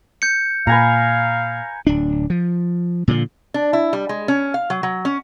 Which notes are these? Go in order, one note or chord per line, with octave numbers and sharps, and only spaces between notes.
G6 C#7
A#2 B4 F5 G#5 A#5
D1 D4
F3
A#2 D3 E3 F3
D4
E4
G3
G#3
C#4
F5
F#3
F#3
C#4